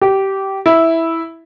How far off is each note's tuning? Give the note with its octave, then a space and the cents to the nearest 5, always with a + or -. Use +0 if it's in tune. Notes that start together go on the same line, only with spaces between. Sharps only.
G4 -15
E4 -5